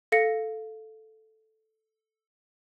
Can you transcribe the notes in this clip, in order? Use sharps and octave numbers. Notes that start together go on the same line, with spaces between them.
A4 F5 A#6 C#7